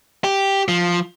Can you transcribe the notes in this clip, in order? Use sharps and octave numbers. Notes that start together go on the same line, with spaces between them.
G4
F3